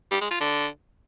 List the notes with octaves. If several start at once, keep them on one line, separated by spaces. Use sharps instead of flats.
G3
G#3
F4
D3